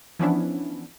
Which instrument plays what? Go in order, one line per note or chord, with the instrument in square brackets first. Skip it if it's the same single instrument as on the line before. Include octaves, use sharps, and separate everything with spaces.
[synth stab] E3 F3 B3 C#4 D4 E4